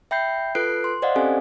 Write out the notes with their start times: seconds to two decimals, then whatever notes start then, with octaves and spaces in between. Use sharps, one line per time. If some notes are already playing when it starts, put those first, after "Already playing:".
0.11 E5 G5 B5 G6 C7
0.55 F4 A4 B4 F#6 C7 D7
0.84 C6
1.02 C5 D5 D#5 F5 F#5
1.15 C4 C#4 G4 A4 G#5